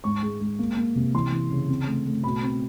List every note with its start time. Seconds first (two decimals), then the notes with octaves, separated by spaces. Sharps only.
0.04 G#2 C#6
0.23 G#3
0.41 G#3
0.59 A#3
0.77 A#3
0.96 C3
1.14 E3 C6
1.32 E3
1.51 C#3
1.69 C4
1.87 A3
2.06 A3
2.24 B2 B5
2.43 C4